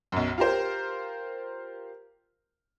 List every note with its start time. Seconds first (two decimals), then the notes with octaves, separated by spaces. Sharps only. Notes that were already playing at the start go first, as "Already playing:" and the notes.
0.12 B1 F#2
0.38 F4 G4 A#4 C5